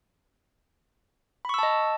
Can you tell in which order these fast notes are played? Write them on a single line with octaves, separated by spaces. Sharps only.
B5 C#6 E6 A5 D#5